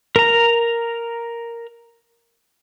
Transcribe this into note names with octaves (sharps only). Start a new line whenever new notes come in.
A#4 A#5